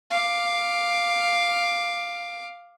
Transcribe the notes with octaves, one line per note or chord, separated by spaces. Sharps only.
F5 D6